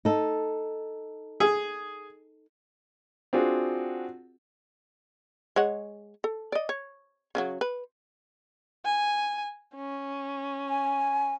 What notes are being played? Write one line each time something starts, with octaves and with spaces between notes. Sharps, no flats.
D#4 A4
G#4
C4 D4 F4 F#4 G#4
G#3 C#5 F#5
A4
D5 D#5
C#5
C#3 F3 F#3
B4
G#5
C#4
G#5